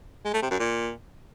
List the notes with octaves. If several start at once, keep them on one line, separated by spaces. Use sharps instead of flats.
G#3
A3
C3
F#2
A#2